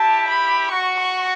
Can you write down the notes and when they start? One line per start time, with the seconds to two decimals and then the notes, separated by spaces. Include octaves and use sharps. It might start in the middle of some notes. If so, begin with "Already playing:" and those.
Already playing: E4 G4 A5
0.28 B5
0.71 F#4 C#6
1.00 C#6